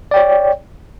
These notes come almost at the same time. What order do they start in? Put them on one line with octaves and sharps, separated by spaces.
D5 G5 C#5